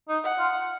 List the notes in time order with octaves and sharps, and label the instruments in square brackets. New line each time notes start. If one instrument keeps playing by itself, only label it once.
[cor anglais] D#4
[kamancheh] F#5
[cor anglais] F4